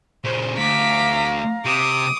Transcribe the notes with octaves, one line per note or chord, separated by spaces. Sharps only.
A#2 C#3 C5
D2 F5 A#5 D6 B6
C3 D6 D#6